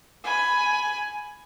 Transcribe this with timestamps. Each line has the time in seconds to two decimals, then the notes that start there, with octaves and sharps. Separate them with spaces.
0.24 G#5 B5